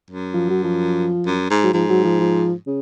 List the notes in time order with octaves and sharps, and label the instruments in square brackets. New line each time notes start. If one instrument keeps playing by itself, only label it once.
[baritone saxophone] F#2
[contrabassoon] F3
F#3
F3
[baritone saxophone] F#2
G#2
[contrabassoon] F#3
[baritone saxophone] G#2 [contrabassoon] F3
[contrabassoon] F#3
F3
F3
C#3